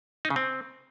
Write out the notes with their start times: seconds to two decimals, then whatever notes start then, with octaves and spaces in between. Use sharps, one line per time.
0.25 D#4
0.30 C#3
0.36 C4